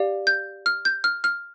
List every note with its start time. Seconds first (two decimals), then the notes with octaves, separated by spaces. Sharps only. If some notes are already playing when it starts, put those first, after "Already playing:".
Already playing: G4 D5 F5
0.27 G6
0.66 F6
0.85 G6
1.04 F6
1.24 F6